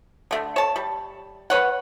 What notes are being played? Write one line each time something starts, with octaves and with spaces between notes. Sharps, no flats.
D3 A3
C#5 A5
G3
B4 C#5 F#5